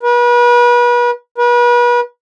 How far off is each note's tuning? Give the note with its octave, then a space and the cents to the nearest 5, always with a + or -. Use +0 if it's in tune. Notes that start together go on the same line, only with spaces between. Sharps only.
B4 -35
B4 -35